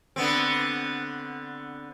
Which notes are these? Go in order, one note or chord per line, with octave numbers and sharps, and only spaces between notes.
D3 B3 C4